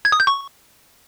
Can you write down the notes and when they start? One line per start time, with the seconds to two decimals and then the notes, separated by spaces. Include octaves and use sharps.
0.05 G#6
0.12 D#6
0.20 G6
0.27 C#6